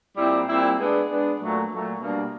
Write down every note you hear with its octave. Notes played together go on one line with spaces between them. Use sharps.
A#2 G3 C4 E4
A#2 G3 C4 E4
G#3 B3 D4
G#3 B3 D4
A#2 F#3 A3
A#2 F#3 A3
B2 G3 A#3 D4